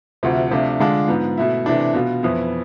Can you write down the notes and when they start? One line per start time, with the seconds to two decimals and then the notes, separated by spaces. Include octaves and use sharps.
0.23 D2 C3 F3 A3
0.51 C3 F3 A3 D4 F4
0.80 D3 G#3 D4 F4
1.08 G#2 F3 B3
1.37 B2 A3 E4
1.66 C3 E3 A3 D4
1.94 B2 B3 F4
2.23 F2 E3 B3 E4